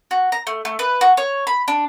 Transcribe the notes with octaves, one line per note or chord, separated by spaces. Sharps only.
F#4
A#5
A3
A3
B4
F#4
C#5
B5
D4